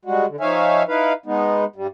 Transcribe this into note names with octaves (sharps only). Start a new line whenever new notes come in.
G3 G#3 F#4
D3
F3 D#4 C#5 E5 F5 G#5
D#4 E4 B4 F5
G#3 B3 D#4
G2 G3